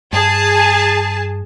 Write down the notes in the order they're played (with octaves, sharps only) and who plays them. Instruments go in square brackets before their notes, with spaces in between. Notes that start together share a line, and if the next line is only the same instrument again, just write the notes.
[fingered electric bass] G2 [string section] G#4 A5